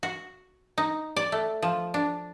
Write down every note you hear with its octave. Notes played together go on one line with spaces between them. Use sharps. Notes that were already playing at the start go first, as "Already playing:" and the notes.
F#4
D#4
D5
A3
F3
D4